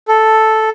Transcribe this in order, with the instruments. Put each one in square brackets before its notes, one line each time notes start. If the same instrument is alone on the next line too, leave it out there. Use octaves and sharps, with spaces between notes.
[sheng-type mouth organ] A4